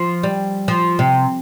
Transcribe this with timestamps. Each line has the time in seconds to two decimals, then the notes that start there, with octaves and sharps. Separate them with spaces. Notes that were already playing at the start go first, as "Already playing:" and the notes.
Already playing: F3
0.23 G3
0.68 F3
0.99 C3